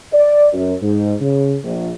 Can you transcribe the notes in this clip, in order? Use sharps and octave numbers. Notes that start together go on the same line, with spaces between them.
D5
F#2
G#2
C#3
A#1